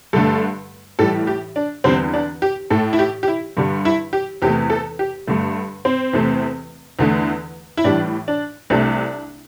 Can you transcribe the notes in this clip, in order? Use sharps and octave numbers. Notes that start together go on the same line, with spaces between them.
G2 D3 A3 A4
A2 E3 G3 A4
G4
D4
E2 D3 G3 C4
D4
G4
A2 A3 A4
E4
G4
G4
E4
G2 D3 G3
E4
G4
E2 C3 A3 G4
A4
G4
G2 D3 A3
C4
E2 C3 A3
E2 D3 A3
E4
A2 E3 G3 D4
D4
C2 C3 A3 D4